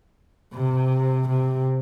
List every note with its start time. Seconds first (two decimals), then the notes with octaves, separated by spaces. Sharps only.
0.54 C3
1.28 C3